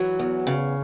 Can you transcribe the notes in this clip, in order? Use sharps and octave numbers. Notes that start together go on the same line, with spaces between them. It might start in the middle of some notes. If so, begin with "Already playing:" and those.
Already playing: E3 F#3
E2
C#3